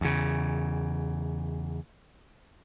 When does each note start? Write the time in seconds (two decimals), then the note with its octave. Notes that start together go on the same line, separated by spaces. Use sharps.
0.01 E2 C#3